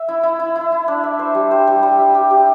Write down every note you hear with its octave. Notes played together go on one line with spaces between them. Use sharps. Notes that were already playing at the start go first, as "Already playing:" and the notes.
Already playing: E5
E4
E4
E4
E4
E4
D4
E5
C5
G3
C5
G3
G3
E5
G4
G4